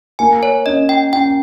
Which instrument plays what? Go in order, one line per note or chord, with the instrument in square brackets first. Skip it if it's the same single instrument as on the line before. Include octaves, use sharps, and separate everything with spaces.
[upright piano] A#3 [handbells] G#5
[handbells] C#5
[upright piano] C#4 [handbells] D#5
[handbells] G5
[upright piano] C#4 [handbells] G5